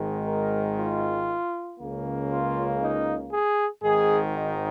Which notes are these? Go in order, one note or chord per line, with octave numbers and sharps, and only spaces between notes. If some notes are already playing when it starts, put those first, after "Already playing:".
Already playing: G#1 G#2 D#3 G#3
A#4
F4
C#2 C#3 A#3
F4
D#4
G#4
G#1 G#2 D#3 G#4
D#4